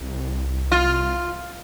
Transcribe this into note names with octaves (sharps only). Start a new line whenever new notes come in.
C2
F4